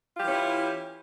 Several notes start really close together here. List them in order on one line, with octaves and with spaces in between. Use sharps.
F4 G4 E3 C#4 E4